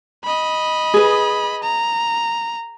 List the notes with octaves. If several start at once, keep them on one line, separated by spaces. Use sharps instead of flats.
D#5 B5
G#4 B4
A#5